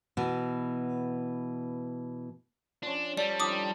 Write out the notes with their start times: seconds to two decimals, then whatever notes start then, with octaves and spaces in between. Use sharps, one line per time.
0.17 B2 E3
2.83 F3 C#4 D4
3.17 G3 A4 D5
3.40 D#3 F3 D4 D6 D#6